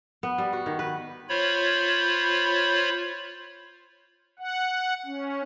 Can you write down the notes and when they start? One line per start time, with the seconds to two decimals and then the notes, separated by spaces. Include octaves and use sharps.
0.23 B3
0.38 G3
0.53 F#4
0.66 D#3
0.79 B4
1.29 F4 C5 C#5 B5
4.39 F#5
5.06 C#4